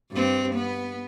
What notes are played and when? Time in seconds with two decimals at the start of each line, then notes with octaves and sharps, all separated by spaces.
0.12 G2 C4
0.55 B3